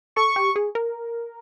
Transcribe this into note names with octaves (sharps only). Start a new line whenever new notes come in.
A4 C#6
G4
G#4
A#4